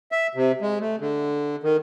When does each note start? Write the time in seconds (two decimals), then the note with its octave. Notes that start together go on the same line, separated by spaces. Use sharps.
0.12 E5
0.35 C3
0.61 G#3
0.81 A3
1.00 D3
1.63 D#3